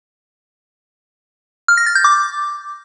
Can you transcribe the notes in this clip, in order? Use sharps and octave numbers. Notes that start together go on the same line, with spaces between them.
F6
A#6
A6
G6
D6